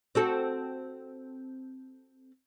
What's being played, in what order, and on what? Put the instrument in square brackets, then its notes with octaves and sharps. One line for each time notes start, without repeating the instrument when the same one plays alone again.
[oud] C4 F#4 A4